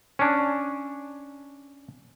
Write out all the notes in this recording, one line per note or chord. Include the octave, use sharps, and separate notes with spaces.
C#4 D4